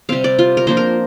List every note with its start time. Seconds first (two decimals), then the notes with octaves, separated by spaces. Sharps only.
0.09 C3 G3 C4 F5
0.24 D5
0.39 F4
0.57 A#4
0.67 F3 A#3 D4 C5
0.77 A#4